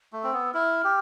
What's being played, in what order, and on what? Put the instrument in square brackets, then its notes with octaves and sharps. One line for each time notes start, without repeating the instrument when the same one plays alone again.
[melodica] A3
[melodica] C4 [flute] E6
[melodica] B3
[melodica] E4 [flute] F6
[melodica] G4